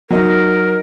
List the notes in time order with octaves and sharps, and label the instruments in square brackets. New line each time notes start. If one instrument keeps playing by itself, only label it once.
[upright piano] F#3 D#4 [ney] A#4